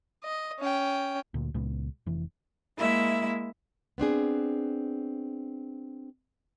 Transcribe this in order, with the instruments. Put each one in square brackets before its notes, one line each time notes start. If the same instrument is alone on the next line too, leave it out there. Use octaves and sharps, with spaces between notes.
[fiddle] D#5
C#4 G5
[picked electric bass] D2 A#2
C#2 A#2 G#3 B3
F1 E3
[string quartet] G#3 A#3 E4 E5
[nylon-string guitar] B3 C4 D4 G#4